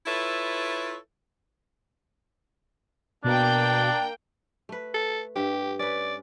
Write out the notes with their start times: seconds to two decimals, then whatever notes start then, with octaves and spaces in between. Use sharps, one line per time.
0.06 E4 F4 A4 B4 C#5 E5
3.24 B2 A#3 D4 G5
4.69 A3 B4
4.94 A4
5.36 G2 G4 E5
5.79 C#4 B4 D5